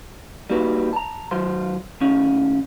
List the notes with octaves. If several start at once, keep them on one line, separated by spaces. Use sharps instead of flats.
G3 A#3 D#4 F#4 B4
A5 A#5
D#3 F#3 C5 C6
A2 D#3 C#4